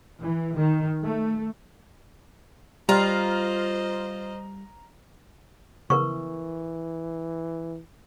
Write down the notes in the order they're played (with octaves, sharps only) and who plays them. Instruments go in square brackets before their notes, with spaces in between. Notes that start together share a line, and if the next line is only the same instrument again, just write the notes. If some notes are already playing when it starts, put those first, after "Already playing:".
[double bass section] E3
D#3
A3
[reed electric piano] G3 [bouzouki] F4 [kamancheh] C5 D#5 [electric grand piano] A#5 F6
[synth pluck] C#3 B3 [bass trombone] E3 [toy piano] A#4 B4 C#6